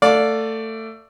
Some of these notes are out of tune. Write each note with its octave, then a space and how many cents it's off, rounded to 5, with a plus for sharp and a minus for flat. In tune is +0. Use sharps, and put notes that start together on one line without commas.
A3 +20 D5 -5 F5 +30